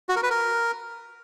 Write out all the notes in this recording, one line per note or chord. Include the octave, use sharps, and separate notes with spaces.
F#4
A#4
B4
A#4